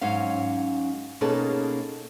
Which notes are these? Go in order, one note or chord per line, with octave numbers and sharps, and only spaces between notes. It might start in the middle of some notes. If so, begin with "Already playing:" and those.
G#2 F#3 C#4 F5
B2 A#3 C#4 D#4 G#4 A4